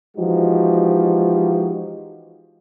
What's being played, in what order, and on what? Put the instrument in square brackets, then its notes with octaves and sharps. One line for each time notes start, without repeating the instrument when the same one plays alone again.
[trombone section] E3 F3 G#3 D#4 F#4 G4